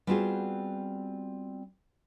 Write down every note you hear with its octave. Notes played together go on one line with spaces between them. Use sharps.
G3 B3 C4 F4 F#4 G#4